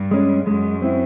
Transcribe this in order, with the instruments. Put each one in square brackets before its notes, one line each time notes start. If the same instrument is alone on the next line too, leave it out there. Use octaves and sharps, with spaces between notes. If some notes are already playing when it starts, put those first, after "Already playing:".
Already playing: [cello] G2
[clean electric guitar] G#3 C#4
[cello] F#2 [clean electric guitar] G#3
[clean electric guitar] C4 E4